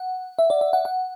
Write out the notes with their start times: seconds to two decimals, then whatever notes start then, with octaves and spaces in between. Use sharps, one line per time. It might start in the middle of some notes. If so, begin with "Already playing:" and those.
Already playing: F#5
0.39 E5
0.50 D5
0.61 E5
0.73 F#5
0.85 F#5